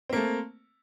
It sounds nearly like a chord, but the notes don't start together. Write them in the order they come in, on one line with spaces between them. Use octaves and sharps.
C4 A#3 A3